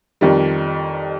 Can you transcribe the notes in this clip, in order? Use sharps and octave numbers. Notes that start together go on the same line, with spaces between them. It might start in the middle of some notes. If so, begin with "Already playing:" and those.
F2 D#3 G3